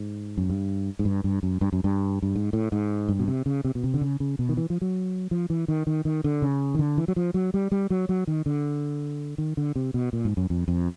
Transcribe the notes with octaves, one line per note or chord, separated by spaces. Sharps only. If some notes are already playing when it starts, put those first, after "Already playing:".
Already playing: G#2
F#2
G2
G#2
G2
G2
F#2
G2
F#2
G2
G2
G#2
A2
G#2
G2
B2
C3
C#3
C3
B2
C3
D3
C#3
C#3
B2
D#3
E3
F3
F#3
F3
E3
D#3
D#3
D#3
D3
C#3
D#3
D3
E3
F#3
F3
F#3
G3
G3
F#3
F#3
D#3
D3
D#3
D3
C3
B2
A#2
G#2
F#2
F2
F2